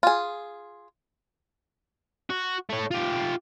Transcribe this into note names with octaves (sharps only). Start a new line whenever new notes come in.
F4 G#4
F#4
A3 C#5
F4 G4